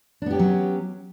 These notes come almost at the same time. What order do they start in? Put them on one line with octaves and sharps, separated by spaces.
D4 B3 G4 C#4 F#3